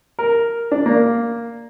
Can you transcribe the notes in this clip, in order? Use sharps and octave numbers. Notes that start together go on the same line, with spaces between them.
A#4
D4
A#3